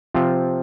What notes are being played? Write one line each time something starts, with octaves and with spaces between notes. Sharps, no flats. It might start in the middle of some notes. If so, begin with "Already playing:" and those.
C3 F3 C4 F4